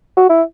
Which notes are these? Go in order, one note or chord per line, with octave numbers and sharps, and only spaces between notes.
F#4
E4